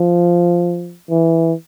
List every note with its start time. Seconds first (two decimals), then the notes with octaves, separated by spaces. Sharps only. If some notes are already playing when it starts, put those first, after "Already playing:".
Already playing: F3
1.10 E3